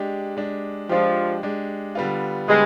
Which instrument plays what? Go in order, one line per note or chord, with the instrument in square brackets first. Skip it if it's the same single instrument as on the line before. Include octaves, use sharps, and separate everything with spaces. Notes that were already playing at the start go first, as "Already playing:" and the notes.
Already playing: [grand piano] G#3 D4 G4
G#3 D4 G4
[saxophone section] F3 [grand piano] G#3 D4 G4
[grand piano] G#3 D4 G4
D3 G3 B3 F4
[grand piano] D3 G3 B3 [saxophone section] G#3